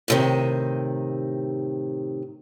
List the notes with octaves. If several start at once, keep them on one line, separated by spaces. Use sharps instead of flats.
A2 C3 D#3